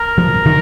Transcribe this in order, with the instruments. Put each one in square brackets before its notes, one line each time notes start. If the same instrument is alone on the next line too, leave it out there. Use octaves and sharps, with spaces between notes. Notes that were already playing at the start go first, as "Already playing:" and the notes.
Already playing: [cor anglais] A#4
[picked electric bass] F3
D#3